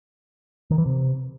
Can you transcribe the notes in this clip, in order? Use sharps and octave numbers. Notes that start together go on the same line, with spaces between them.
D#3
E3
C3